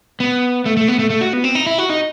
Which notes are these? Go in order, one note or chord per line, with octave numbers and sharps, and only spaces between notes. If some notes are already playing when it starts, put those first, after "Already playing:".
B3
A3
A3
B3
A3
A3
F#4
B3
C4
D#4
E4
F#4
D#4